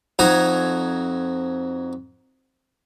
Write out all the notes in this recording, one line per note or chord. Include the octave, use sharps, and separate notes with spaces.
F2 D#4 F#4 G#5 A#5